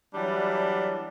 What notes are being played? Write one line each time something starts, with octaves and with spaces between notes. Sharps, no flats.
E3 F#3 G3 D4